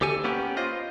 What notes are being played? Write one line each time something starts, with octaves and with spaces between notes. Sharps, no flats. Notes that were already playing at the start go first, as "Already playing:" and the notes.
D2 G4 A4 G#5
A#3 B3 C#4 G4
F4 C5 D#5